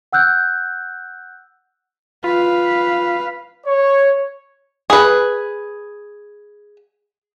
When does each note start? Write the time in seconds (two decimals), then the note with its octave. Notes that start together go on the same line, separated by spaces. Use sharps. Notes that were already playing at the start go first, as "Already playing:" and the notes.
0.13 F#5 E6 F#6 G6
2.24 F4 B4 F5
3.65 C#5
4.90 G#4 B4